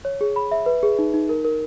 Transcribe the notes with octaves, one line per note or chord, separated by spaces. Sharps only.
C#5
G#4
B5
E5
B4
G#4
D#4
D#4
A#4
A#4